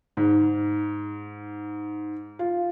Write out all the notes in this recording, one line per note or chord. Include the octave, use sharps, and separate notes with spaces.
G#2
F4